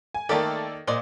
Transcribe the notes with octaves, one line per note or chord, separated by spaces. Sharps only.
G#5
D#3 A3 A#3 G4 A4 D5
A#2 C5 D5 D#5